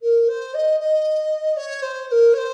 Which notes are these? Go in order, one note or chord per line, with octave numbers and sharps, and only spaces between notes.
A#4
C5
D#5
D#5
C#5
C5
C5
A#4
C#5
C5